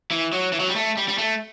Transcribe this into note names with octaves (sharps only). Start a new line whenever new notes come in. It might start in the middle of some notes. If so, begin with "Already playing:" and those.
E3
F#3
E3
F#3
G3
A3
G3
G3
A3